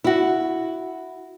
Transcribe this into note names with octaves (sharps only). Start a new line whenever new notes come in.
E4 F#4